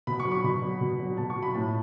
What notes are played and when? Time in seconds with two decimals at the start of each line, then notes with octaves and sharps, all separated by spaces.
0.07 B2 B5
0.20 C#6
0.25 F#3
0.32 C#6
0.44 B2 B5
0.62 F#3
0.81 B2
0.99 F#3
1.17 B2 A5
1.30 C#6
1.37 F#3
1.43 B5
1.54 A2 A5